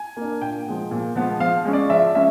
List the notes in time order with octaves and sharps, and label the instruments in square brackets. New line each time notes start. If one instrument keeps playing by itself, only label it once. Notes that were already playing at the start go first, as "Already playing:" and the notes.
Already playing: [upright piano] G#5
A#3 D4
A#2 G5
F3 G#3 B3
A#2
F3 G#3 B3
F3 F5
G#3 C#4
D5
F3 E5
G#3 C#4 E5